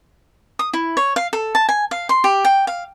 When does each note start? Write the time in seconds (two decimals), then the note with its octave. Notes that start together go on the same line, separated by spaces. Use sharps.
0.59 D#6
0.73 E4
0.97 C#5
1.16 F5
1.33 A4
1.55 A5
1.69 G#5
1.91 F5
2.09 C6
2.24 G4
2.45 G5
2.67 F5